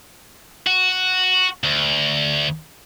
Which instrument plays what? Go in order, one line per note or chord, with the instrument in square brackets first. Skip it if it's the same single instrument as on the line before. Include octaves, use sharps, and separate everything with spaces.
[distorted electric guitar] F#4
D2